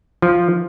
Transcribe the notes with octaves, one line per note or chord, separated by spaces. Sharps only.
F3